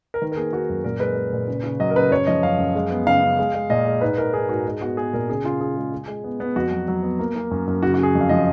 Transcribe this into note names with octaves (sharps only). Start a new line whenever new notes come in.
A#4
D#3 B4
A#4
A#3 G#4
D#3 F#4
F#2
A#2 A#4
G#3 B4
G#3
A#2
C#3
C#3
F#3 D#5
A#4
C#3 B4
F#2 C#5
F3 D#5
F#2 F5
F#2
G#3
B3
C#3 F5
C#3
G#3
G#3
A#2 D#5
G#3
G#2 B4
G#2 A#4
G#2 G#4
G#2 F#4
G#3
B3 F#4
B3 G#4
A#2 A#4
C#3 G#4
C#3 F4
C#3 G#4
G#3
G#3
G#3
B3
B3
F2 F#4
F#3
F#3
B3
A#3
A#3
F#2
F#2
C#3 F#4
C#3 F#4
G#4
F2
F5
F3 D#5